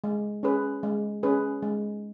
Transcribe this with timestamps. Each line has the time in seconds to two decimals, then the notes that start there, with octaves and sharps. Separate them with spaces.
0.04 G#3
0.43 C#4 G#4 B4
0.83 G#3
1.23 C#4 G#4 B4
1.62 G#3